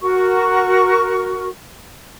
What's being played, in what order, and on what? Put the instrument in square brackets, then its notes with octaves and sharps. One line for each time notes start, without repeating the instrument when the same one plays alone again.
[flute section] F#4 A#4 C#6